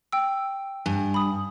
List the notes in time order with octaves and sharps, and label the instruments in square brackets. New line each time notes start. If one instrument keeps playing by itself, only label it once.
[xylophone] G5 E6
[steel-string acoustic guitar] G2 [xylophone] G#5
[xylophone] B5 D#6